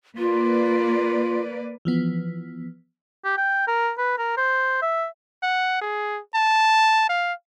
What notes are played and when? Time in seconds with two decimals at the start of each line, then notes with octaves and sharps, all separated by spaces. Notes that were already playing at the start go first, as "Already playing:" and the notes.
0.18 A#3 F4 B4 D5
1.85 E3 F3 B3
3.24 G4
3.37 G5
3.67 A#4
3.98 B4
4.18 A#4
4.37 C5
4.82 E5
5.43 F#5
5.81 G#4
6.34 A5
7.09 F5